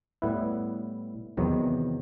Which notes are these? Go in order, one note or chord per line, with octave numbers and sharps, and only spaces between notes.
A2 G3 B3 E4 B4
E2 C3 D#3 F#3 B3